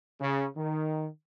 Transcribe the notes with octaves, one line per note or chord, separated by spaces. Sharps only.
C#3
D#3